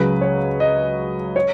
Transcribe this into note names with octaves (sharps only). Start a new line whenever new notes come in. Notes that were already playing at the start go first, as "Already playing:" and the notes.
Already playing: C#2 C#3 F#3 B4
C#5
D#5
C#5